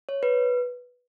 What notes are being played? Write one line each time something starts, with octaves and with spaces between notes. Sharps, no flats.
C#5
B4